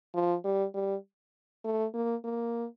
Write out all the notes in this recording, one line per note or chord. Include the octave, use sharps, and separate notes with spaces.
F3
G3
G3
A3
A#3
A#3